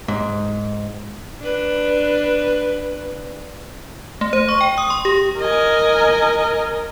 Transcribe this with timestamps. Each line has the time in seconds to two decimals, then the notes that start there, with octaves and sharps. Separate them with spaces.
0.08 G#2
1.40 D4 B4
4.21 A3
4.33 C5
4.49 C#6
4.61 G5
4.78 D#6
4.90 C6
5.05 G4
5.38 A#4 D#5 G#5